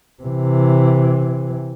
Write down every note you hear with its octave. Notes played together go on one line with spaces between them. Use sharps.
C3 E3